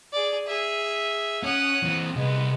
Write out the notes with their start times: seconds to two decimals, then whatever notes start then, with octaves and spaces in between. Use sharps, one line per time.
0.13 G#4 D5
0.47 G#4 E5
1.43 C#4 F#5 D#6
1.83 E3 C4
2.16 C2 G#3 B3